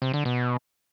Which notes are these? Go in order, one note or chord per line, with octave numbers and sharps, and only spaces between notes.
C3
D3
B2